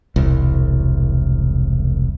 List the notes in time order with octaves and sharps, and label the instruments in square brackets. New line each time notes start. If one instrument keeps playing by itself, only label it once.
[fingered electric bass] E1 C2